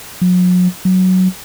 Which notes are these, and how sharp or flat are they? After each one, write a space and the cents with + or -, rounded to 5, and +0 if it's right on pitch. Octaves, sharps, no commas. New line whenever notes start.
F#3 -40
F#3 +5